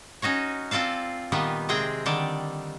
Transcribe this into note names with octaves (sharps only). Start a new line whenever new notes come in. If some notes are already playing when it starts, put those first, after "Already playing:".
C#4 D#4 F#4 C#5
C4 F4 A4 D5 F5
A#2 D#3 G3 B3
C3 G#3 C4 G#4 G5
D3 D#3 G3 D5